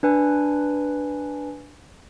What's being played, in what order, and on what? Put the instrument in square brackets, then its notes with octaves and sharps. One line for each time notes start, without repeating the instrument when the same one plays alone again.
[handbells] D4 B4 G#5